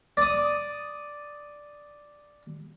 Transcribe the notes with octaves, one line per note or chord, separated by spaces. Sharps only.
D5 D#6